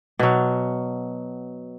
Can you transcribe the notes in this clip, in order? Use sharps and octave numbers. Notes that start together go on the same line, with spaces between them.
B2 F#3